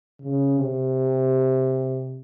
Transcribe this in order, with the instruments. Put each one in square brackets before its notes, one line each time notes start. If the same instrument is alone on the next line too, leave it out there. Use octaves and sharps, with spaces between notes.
[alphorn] C#3
C3